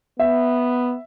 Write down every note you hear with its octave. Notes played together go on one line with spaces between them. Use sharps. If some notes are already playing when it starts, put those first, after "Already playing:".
B3 E5